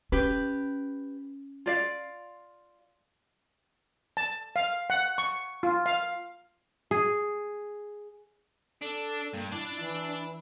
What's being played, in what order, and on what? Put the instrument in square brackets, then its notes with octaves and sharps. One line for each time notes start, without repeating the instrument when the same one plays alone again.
[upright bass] C#4 [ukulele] G4 B4
[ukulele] F4 D5 F5
[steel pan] A5
F5
F#5
C#6
F4
F5
[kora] G#4
[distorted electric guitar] D4 [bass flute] A4
[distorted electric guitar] G2 [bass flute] A#3
[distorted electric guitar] D4 D5 [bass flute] E4
[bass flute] E3